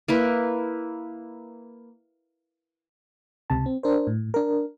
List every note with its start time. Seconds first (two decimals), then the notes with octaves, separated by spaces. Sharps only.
0.08 A#3 E4 B4
3.50 C#2 C3 A5
3.66 C4
3.83 D4 A#4 C5
4.07 A2
4.34 D4 A#4